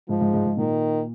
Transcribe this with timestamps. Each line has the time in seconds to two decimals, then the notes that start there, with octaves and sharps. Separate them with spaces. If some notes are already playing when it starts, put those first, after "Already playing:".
0.09 G#2 F3
0.21 G#2
0.34 G#2
0.46 G#2
0.57 A#2 D#3